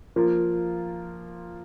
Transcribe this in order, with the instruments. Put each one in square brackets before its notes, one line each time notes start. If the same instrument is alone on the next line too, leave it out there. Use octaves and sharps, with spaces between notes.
[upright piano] F3 A#3 F4 A#4